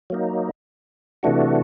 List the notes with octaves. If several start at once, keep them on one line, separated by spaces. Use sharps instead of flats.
F#3 A#3 D#4
C3 E3 A3 D4 F#4